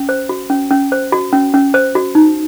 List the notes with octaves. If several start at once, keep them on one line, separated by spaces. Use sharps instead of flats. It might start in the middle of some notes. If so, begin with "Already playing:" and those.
Already playing: C#4
C5
F#4
C#4
C#4
C5
F#4
C#4
C#4
C5
F#4
D#4